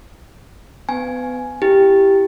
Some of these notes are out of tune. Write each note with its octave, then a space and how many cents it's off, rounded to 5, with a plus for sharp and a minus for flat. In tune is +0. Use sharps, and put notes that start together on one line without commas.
B3 +30 G#5 +10
E4 +0 G4 +0